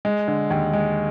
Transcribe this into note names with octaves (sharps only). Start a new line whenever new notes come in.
G#3
D3
D#2
G#3